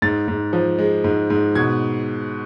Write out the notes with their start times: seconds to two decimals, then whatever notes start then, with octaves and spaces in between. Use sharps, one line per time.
0.02 G#2 A6
0.28 G#2
0.53 F3
0.78 G#3
1.04 G#2
1.30 G#2
1.55 B2 G#6